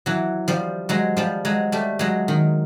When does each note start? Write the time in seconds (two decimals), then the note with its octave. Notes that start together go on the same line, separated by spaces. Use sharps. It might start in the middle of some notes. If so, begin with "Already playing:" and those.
0.06 E3 F#3
0.48 F3 G3
0.89 F#3 G#3
1.17 F3 G3
1.45 F#3 G#3
1.72 G3 A3
1.99 F#3 G#3
2.28 D#3